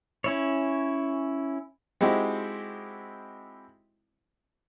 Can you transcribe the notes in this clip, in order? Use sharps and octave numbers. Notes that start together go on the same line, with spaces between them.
C#4 E4 C#5
G#3 C4 D#4 E4 F#4 G4